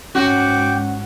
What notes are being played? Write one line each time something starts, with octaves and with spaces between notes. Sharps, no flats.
G#2 C#4 F#4 G5 D6